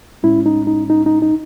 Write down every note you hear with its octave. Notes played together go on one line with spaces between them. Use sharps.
A2 G#3 C#4 E4
D#4
D#4
D#4
D#4
D#4